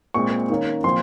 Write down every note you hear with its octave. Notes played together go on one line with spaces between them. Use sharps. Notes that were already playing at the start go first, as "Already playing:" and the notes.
A#2 G#3 C4 C#6
D#3 A#3 C#4
A#2 F3 C4 C6